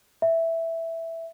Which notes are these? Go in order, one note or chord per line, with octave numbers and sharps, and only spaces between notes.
E5